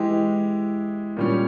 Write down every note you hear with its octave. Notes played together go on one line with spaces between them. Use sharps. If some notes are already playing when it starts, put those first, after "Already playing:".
Already playing: E3 G#3 E4 G4
A#2 G3 C#4